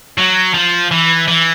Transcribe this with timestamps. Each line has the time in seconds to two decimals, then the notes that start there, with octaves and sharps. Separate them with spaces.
0.18 F#3
0.54 F3
0.91 E3
1.28 E3